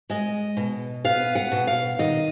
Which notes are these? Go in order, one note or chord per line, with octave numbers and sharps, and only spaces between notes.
G#3 D#5
B2
B3 F5
F#5
B2
F5
D#3 D#5